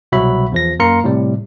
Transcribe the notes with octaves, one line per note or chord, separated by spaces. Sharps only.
C2 B2 F#3 F#4 E5 B5
E2 F3 A#6
F#2 A#3 A#4 A#5 C6 C#7
A2 C3 G3